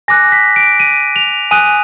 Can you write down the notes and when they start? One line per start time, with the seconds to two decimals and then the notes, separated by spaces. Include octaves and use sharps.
0.08 G#5 D6 F#6 A#6
0.32 B6
0.56 D7
0.80 D#7
1.16 F7
1.51 G#5 D#6 F#6 D#7